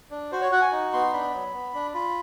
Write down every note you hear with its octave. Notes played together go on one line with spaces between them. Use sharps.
D4
F#4 C5
C#5
F#4 F#5
G#5
D#4
B3 C6
D4 B5
F#3
B3
D4
F4 B5